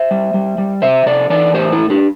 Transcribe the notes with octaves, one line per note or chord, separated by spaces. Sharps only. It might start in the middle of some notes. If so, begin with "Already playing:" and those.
Already playing: C5 E5
G3
G3
G3
C3 C5 E5
C3 A4 D5
E3 A4 D5
A2 G4 C5
E4 A4
A2
D4 G4